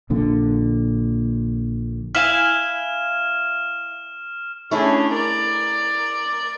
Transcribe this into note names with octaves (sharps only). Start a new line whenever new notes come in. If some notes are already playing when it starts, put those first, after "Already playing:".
A#1 A#2 D3
E4 F5 G#5 F6 E7
A3 C#4 D4 E4 G#4
A#4 D5